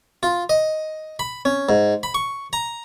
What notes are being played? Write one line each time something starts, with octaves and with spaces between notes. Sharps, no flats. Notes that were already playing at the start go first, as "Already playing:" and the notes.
F4
D#5
B5
C#4
G#2
B5
C#6
A#5